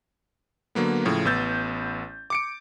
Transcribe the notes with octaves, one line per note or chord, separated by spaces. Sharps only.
D3 F#3 A#3 B3
A2 C#3 F3
A1 B3 E6 G6 A6
D6 C#7 D7